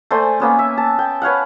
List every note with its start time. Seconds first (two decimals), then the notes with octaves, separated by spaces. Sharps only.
0.11 A3 C5 D5 G#5
0.40 A#3 B3 C#4
0.59 E5
0.78 A5
0.99 G5
1.22 B4 C#5 F5 F#5